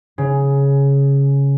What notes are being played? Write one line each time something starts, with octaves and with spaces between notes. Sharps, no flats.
C#3